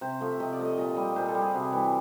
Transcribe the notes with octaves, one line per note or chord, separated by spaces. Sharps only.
C3 C5
F3 A3
E5
C3 D#5
D5
F3 A3
D#5
A#2 D#5
G3 D#5
A#2 C5
A4
G3
G#4
C3 F#4
E3 G3